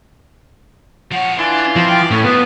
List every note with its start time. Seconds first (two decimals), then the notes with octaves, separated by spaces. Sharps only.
1.12 F3 C#5 F#5
1.38 E3 D4 F4 G#5 C6
1.76 F3 C4
1.89 D5 G5
2.11 A2 C#4 C#6
2.25 D#2 F3 B3 F#6